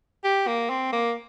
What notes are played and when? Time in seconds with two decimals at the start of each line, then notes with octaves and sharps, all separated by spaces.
0.24 G4
0.47 A#3
0.70 C4
0.92 A#3